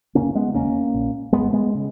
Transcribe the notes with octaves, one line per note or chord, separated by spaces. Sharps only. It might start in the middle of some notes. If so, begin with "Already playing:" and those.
F#2 C#3 A#3 C#4
F#1
G#3 B3
E1 D#2 C#3 A#3 C#4
A#1 A#2
G#1 G#2 G#3 B3
G#3 B3
C#3